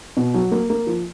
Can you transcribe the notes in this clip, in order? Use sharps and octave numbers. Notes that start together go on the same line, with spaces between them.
B2
F#3
A#3
A#3
F3